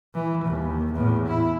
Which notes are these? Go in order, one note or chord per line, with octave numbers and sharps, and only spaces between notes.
E3
D#2
E2 A2
E4